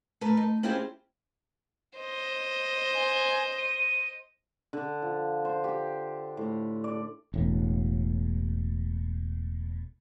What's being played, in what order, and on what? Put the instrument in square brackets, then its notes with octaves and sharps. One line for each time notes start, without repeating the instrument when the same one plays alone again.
[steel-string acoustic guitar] A3 A#4 B4
D#4
C4 C#4 E4 F4 G4 G#4
[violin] C5 D#5
[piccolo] G#5
D#7
[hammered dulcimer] D3
F3
C5
G4
A2
D5
[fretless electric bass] E1 A2